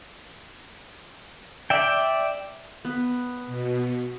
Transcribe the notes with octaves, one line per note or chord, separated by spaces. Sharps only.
D5 E5 G5
B3
B2